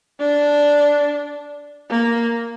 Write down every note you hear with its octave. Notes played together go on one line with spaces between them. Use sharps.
D4
A#3